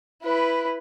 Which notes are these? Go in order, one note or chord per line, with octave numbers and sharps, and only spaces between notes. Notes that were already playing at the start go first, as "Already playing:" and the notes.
E4 B4